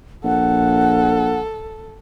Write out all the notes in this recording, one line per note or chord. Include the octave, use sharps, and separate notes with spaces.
A#1 A4 F#5